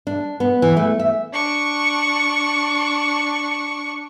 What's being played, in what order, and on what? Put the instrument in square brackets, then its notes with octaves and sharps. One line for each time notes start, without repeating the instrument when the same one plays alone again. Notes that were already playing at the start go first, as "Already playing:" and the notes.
[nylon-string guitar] D4
B3
E3
A3
E5
[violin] D4 C#6